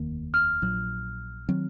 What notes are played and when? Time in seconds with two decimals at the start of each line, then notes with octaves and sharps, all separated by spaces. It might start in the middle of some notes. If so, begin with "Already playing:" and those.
Already playing: F1 D#2 D#3 A#3
0.34 F6
0.62 A#1 A#2 F#3
1.49 D#3 F#3 C4